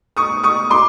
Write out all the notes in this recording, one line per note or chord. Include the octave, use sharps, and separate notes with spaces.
C#6 D#6
C#6 D#6
C6 D6